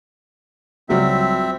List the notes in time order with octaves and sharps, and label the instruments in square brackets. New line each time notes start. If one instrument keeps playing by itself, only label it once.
[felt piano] C#2 F#3 G3 [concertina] C4 E5